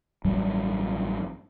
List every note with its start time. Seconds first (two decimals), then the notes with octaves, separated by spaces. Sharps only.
0.25 A1 G2 F#3 G3